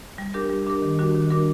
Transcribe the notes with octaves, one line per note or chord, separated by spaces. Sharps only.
G3
D4 G4 A#4
G3
D4 G4 A#4
D#3
G3 D4 F#4 A#4
D#3
G3 D4 F#4 A#4